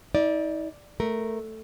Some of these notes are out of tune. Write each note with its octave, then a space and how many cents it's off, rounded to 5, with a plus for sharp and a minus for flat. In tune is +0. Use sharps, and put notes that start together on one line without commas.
D#4 +45 D5 +0
A3 +0 A#4 +0